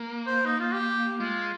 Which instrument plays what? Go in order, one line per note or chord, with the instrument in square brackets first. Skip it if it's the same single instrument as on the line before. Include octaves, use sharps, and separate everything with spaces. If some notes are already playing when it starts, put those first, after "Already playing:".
Already playing: [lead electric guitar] A#3
[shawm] C5
D#4
F4
G4
[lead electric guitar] G#3 [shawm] F4